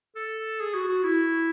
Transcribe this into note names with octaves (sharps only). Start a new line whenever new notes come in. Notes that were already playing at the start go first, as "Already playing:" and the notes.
A4
G#4
F#4
F#4
E4